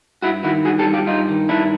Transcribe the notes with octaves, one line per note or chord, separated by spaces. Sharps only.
G2 E4 F#4
D#3 E4 F#4
G2 F#4 G#4
G4 A4
G3
F4 G4
G2 D#4 F4
D#3
G2 D4 E4